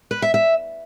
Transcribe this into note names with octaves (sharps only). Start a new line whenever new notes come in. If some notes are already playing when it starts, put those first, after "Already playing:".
B4
E5
E5